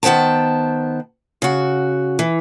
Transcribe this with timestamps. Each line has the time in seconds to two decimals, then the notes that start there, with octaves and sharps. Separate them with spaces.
0.03 D#3 B3 C5 G5 A5
1.42 C#3 F#4
2.19 E3